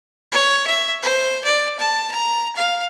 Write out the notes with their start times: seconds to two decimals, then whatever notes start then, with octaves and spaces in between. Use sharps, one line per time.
0.32 C#5
0.67 E5
1.03 C5
1.44 D5
1.79 A5
2.11 A#5
2.55 F5